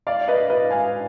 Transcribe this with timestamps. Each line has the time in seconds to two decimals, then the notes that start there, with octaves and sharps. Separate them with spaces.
0.07 D5 F5
0.28 B4 D#5
0.50 B4 D#5
0.70 F5 G#5